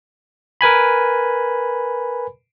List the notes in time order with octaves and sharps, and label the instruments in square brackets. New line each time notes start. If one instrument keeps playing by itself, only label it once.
[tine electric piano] A#4 B4 G#5 B5